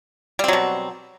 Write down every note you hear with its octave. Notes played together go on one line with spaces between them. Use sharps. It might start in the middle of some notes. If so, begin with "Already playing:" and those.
B2 F#3 G3 C4